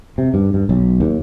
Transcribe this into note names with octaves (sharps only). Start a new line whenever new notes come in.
C3
G2
G2
B1
D#2